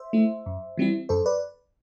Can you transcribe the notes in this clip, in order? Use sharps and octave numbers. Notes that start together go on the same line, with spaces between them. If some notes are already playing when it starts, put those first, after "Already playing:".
Already playing: C5 E5
A3 E4
F#2
E3 G3 C4 E4
F#2 A4 C5
B4 D5